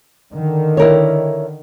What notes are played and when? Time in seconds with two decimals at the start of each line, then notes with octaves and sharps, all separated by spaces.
0.32 D3 D#3
0.77 E4 A#4 C#5